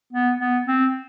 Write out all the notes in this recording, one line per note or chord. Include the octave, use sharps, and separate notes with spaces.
B3
B3
C4